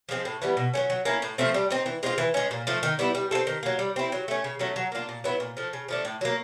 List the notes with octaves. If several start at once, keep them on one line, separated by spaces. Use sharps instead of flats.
F3 G#3 C4
A2
E3 G3 B3
B2
F#3 A3 C#4
F#3
A#3 C#4 E4
A2
F3 A3 C4
G3
C4 D#4
E3
G#3 C4 F4
E3
G#3 C#4
A#2
F3 A3
D#3
G3 B3 E4
G3
C4 F4 A4
D#3
F#3 A#3
G3
C4 E4
F#3
A3 C#4
C#3
F#3 A3 C#4
F#3
A#3 D4 F4
A#2
F#3 B3 E4
A#2
F3 A3
C#3
F3 A3 D4
A2
F#3 A#3